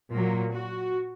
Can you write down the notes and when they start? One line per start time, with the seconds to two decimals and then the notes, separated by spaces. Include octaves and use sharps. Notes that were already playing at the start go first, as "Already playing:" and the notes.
0.13 A#2 F#3 A#3
0.53 F#4